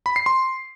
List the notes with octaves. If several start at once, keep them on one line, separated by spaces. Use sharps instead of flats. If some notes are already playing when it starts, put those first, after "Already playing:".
B5
C7
C6